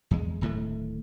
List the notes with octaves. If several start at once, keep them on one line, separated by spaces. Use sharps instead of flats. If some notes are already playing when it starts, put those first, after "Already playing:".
E2 G#3
D1 A2 D#3 A3